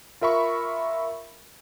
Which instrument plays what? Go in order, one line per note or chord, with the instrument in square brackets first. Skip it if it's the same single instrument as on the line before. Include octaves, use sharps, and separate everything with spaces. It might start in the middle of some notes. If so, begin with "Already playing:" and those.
[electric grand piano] F4 A#4 E5 B5 C#6